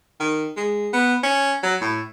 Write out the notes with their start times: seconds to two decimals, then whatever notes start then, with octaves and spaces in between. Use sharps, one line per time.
0.20 D#3
0.57 G#3
0.93 B3
1.24 C#4
1.63 F#3
1.81 A2